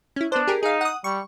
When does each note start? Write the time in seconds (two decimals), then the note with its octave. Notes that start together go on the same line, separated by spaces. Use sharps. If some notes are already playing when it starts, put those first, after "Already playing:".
0.16 C#4 E4
0.32 B3 D4 C5
0.48 G4 G#4 A#4
0.63 D#4 G#4 F5
0.81 F#5 D#6
1.04 G3 C#6